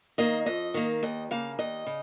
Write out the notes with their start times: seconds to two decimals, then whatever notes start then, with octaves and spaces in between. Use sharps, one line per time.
0.18 D#3 A#3 D#5
0.46 F2 D#5
0.74 D#3 A#3
1.03 D#2 D#5
1.31 C#3 A#3 F5
1.59 D#2 D#5
1.86 C#3